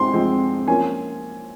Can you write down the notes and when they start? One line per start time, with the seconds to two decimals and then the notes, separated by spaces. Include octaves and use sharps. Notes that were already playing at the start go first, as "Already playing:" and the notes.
Already playing: G#3 C4 C6
0.13 F3 G#3 C4
0.68 F3 A#3 C#4 G#5